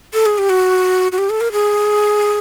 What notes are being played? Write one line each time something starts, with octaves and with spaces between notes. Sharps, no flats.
A4
G#4
G4
F#4
F#4
G4
A4
A#4
G#4